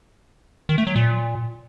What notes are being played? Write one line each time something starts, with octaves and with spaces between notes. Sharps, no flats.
D#3
A3
F#3
A#2